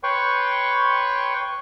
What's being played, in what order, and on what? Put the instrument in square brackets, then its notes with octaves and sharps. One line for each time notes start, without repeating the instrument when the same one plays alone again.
[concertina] B4 C#5 G5 C6 C#6